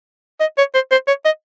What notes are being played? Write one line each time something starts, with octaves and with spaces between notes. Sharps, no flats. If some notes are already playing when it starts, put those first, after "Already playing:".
D#5
C#5
C5
C5
C#5
D#5